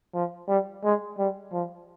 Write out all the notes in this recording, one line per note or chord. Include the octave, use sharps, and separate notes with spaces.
F3
G3
G#3
G3
F3